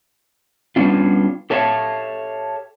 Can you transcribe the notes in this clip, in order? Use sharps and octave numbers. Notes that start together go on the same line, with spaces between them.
G3 B3 C#4 D4 F4
G4 A4 C#5 E5 F5 A5